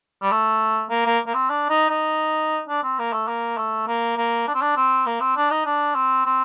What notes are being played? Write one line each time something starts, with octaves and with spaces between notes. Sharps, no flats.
G3
A3
A#3
A#3
A#3
C4
D4
D#4
D#4
D4
C4
A#3
A3
A#3
A3
A#3
A#3
D4
C4
D4
C4
A#3
C4
D4
D#4
D4
C4
C4